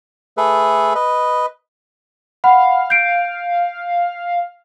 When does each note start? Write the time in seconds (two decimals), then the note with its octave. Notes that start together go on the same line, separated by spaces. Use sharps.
0.37 A3 G#4 A4 B4
0.95 B4 D#5
2.44 F5 F#5 B5
2.90 G6 C7 D7